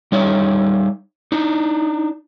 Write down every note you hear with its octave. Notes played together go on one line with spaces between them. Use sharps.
G3 D#4 C#5 E5
D4 D#4